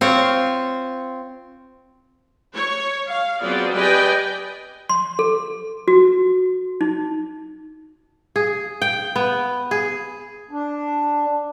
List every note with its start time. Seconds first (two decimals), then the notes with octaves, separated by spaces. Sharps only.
0.01 C4 F4 C#5
2.54 C#5
3.08 F5
3.42 F#3 B3 C4 F4 G#4 D5
3.73 G4 B4 D5 D#5 G5 G#5
4.89 C6
5.19 A4
5.88 F#4
6.81 D#4
8.36 G#4
8.82 G5
9.16 B3
9.71 G#4
10.51 D4